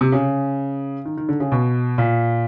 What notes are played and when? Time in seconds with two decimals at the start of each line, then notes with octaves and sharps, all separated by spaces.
0.01 C3
0.12 C#3
1.06 D#3
1.17 D#3
1.29 D3
1.40 C#3
1.52 B2
1.98 A#2